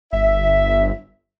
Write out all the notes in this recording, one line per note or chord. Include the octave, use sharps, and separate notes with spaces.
G1 E5